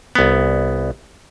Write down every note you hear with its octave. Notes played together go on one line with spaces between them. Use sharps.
C2 B3